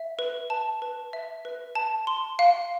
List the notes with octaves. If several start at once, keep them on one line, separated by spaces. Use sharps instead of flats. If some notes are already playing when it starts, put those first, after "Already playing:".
Already playing: E5
B4
A5
B4
E5
B4
A5
C6
F5